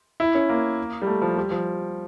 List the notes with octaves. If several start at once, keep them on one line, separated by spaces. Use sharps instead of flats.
E4
C#4
A#3
G3
A3
F3
G3
F3